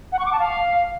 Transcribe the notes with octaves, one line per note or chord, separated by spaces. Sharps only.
F#5
C#6
D6
A5
F5